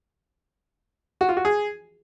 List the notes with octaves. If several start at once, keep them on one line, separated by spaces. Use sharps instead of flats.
F#4
F4
F#4
G#4